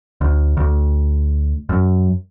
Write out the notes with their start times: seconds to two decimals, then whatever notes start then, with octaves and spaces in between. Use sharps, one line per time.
0.21 D2
0.57 D2
1.69 F#2